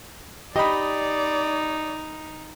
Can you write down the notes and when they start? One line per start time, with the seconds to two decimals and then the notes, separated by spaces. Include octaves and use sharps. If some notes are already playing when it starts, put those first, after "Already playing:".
0.56 D#4 G4 D5 D#5 B5